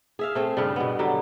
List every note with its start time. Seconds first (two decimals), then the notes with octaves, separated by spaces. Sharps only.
0.19 G#4 E5 F5
0.35 A3 C4 G#4
0.57 G2 C#3 G3
0.76 B2 B3
0.99 D3 F#3 G3